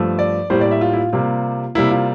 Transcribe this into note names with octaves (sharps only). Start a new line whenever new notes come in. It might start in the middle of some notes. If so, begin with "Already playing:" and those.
Already playing: G2 F3 A3
D5
A2 G3 A#3 C5
D5
E5
F4
E4
F4
C3 G3 A#3 F4
C3 G3 A#3 E4
F4